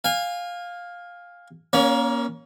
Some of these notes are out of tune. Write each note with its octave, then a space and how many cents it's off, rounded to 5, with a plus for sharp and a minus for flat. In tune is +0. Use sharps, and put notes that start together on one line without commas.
F5 +10 G#5 -25
A#3 +25 C#4 +0 C#5 +45